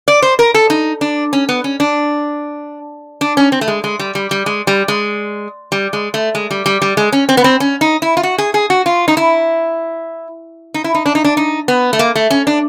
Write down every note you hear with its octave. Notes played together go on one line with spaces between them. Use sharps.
D5
C5
A#4
A4
D#4
D4
C#4
B3
C#4
D4
D4
C#4
C4
A3
G#3
G#3
G3
G3
G3
G#3
G3
G#3
G3
G#3
A3
G#3
G3
G3
G3
G#3
C#4
C4
B3
C4
C#4
D#4
E4
F4
F#4
G#4
G#4
F#4
F4
D#4
E4
D#4
E4
D#4
D4
D#4
D4
D#4
B3
A3
A#3
A3
C#4
D4